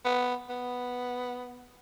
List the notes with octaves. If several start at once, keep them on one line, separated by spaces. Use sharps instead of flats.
B3
B3